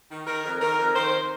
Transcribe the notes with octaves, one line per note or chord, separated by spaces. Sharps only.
D#3
D#3 A#4
F2
D#3 A#4
F2
D#3 C5